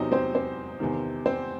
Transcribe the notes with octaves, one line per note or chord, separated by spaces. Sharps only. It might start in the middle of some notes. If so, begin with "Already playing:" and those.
Already playing: E2 C3 F#3 C4 D#4 D#5
C4 C5
C4 C5
E2 C3 D#3
C4 C5